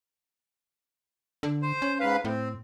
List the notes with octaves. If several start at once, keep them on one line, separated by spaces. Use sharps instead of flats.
D3
C5
C#4
G#2 B4 F5
A2 C4